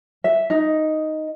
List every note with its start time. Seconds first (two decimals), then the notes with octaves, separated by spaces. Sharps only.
0.24 E5
0.50 D#4